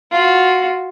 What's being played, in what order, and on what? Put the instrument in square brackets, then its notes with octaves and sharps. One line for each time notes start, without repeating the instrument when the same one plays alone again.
[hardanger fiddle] F4 F#4